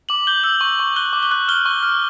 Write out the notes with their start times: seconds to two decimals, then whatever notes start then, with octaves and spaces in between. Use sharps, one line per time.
0.09 D6 F#7
0.27 G6 G7
0.44 E6 F#7
0.61 C#6
0.79 C#6
0.96 F#6 G7
1.13 D6
1.23 G7
1.31 F#6
1.48 F6 G7
1.66 C#6
1.83 F6